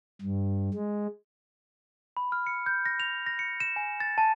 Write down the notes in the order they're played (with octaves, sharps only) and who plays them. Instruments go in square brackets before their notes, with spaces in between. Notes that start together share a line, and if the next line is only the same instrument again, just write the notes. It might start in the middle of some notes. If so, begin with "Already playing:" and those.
[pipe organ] G2
G#3
[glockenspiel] B5
F6
C#7
G6
A#6
F7
A#6
C#7
E7
G#5
A6
A5